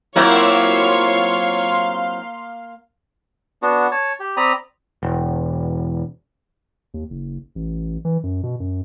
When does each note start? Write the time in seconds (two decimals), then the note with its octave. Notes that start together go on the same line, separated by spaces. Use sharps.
0.16 F#3 A#3 C4 E4 F4 C#5 F5 C6
3.62 B3 D4 F#4
3.91 C#5 A5
4.20 G4
4.37 C4 D5 A#5 B5 D#6
5.03 E1
6.94 D#2
7.10 F#1
7.55 A1
8.05 E3
8.23 F#2
8.43 B2
8.60 F#2